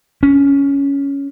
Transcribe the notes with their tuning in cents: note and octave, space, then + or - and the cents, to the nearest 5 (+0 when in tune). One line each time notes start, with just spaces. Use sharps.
C#4 +10